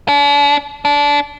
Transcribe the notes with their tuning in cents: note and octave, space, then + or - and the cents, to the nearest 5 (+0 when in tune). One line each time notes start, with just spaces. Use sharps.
D4 -45
D4 -20